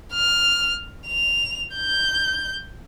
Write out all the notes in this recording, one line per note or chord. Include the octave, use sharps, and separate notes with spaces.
F6
F7
G6